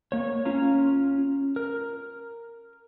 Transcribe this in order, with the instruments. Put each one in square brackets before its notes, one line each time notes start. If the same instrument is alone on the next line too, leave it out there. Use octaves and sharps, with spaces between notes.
[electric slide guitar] A#3 C#5
C#4 F4 A#5
A#4